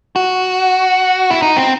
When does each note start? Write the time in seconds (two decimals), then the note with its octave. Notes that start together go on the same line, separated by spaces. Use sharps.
0.16 F#4
1.31 E4
1.42 D#4
1.57 C4